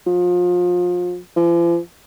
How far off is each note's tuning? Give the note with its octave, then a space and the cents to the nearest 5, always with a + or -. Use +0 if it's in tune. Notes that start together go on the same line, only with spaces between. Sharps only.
F3 +30
F3 -45